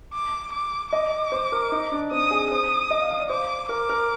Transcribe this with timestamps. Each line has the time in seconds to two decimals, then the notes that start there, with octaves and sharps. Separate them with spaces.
0.13 D6
0.53 D6
0.93 D#5 D6
1.32 C5
1.52 A#4
1.72 D#4
1.92 D4
2.11 C4 D#6
2.31 G#4
2.51 C5 D#6
2.91 D#5
3.00 F5
3.10 F5
3.20 D5
3.30 C5 D6
3.69 A#4 D6
3.89 A#4